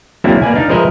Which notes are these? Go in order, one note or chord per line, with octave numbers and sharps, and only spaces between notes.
F#3 G#3 A#3 C4 D4 E4
A#3 B4 D5 G#5
D4 D#4 F5
F3 G#3 A#4 B4 D#5 E5